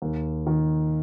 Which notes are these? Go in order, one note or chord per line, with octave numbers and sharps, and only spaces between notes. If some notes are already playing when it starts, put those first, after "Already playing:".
D#2
D#3